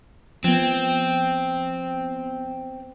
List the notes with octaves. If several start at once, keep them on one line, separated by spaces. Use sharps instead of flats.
F3 B3 C4